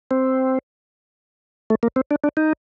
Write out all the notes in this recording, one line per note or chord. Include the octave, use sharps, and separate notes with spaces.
C4
A3
A#3
C4
D4
D4
D#4